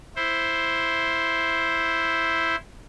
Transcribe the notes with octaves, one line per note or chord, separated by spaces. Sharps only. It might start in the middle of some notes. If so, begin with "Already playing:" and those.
E4 C5